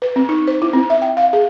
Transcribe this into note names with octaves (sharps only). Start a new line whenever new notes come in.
B4
C4
D#4
C5
E4
C4
E5
G5
F5
G#4